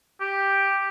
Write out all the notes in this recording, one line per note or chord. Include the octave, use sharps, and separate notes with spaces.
G4